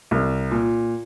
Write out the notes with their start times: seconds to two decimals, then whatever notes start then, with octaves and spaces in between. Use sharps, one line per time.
0.11 C2
0.51 A#2